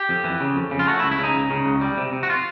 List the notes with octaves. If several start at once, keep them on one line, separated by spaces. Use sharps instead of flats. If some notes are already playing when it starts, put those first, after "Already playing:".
Already playing: G4
F2
E3
C#3
F2
C#3
F4
A3 F#4
E4
C#2
E4
C#3 D#4
C#2
C#3
C#2
G3
C3
C3
F#4
F4